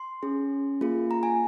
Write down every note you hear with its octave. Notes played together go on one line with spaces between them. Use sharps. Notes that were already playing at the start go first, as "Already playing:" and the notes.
Already playing: C6
C#4 G#4
A#3 F4 G#4
A#5
G#5